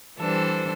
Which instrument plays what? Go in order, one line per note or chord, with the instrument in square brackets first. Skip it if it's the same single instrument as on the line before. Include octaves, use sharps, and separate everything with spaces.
[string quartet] E3 G3 D4 A4 C5